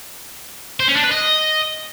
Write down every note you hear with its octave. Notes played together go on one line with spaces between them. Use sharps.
C5
C#4
D4
B4
D#5